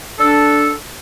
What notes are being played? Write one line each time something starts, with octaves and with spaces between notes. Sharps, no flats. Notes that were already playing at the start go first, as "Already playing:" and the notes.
D4 A4